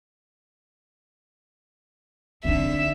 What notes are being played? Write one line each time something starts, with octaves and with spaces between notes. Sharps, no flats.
D3 C4 D#4 E5